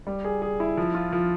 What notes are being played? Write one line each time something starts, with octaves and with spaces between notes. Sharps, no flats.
G3
G#4
G#4
E4
F3
F4
F3